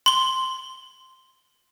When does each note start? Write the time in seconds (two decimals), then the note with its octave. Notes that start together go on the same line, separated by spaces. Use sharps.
0.06 C6 G7